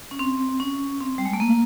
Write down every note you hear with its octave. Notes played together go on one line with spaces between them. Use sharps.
C#4
C4
C#4
C4
G3
G#3
A3
A#3